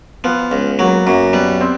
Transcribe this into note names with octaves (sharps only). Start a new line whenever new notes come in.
F3 B3
C#2
F#3 A#3
F#2 A#3
G3 B3
C4